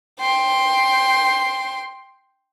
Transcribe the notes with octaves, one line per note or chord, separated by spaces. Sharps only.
G5 C6